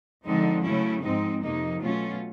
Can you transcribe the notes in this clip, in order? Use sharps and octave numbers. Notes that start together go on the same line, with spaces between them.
D3 F3 G#3 C4 D#4
C#3 F#3 A3 C#4 E4
G#2 F3 G#3 C4 D#4
F2 C3 F3 A#3 D#4
B2 F#3 A3 C#4 F4